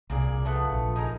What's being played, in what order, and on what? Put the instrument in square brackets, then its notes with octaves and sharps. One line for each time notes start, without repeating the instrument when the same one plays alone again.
[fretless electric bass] C2 [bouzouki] A#2 G#4 D5
[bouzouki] F3 A3 B3
[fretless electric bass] A#1
[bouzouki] D#4 G#4 A#4